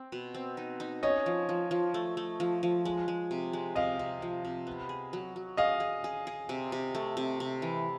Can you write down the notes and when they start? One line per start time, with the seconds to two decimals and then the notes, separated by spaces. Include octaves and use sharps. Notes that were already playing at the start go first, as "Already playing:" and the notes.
Already playing: C4
0.12 B2
0.34 C4
0.57 D#4
0.80 D#4
1.03 C#4 C#5 D#5
1.26 F3
1.49 F3
1.71 F3
1.94 A3
2.17 A3
2.40 F3
2.63 F3
2.85 G#3
3.08 G#3
3.31 C3
3.53 G#3
3.75 C3 D#5 F5
3.99 C3
4.22 F3
4.45 C3
4.67 B3
4.89 G#4
5.13 F#3
5.36 F#3
5.57 G#4 D#5 F5
5.80 G#4
6.04 G#4
6.27 G#4
6.49 C3
6.72 C3
6.95 A3
7.17 C3
7.40 C3
7.62 E3